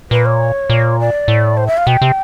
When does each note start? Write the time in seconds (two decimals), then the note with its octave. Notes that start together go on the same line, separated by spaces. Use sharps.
0.11 A#2 B4
0.26 C#5
0.70 A#2
1.00 D5
1.28 A2
1.57 C5
1.67 E5
1.77 F5
1.87 B2 G5
2.02 C3